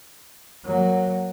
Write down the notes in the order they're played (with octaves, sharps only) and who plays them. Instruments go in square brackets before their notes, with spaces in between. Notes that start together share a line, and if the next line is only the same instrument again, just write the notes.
[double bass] F#3 A#3